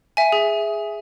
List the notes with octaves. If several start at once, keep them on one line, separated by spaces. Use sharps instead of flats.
E5 G#5
G#4